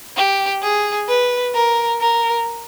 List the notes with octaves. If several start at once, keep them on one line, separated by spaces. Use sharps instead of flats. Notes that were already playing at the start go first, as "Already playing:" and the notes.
G4
G#4
B4
A#4
A#4